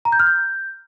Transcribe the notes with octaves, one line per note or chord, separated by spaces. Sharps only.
A#5
G6
F6
G6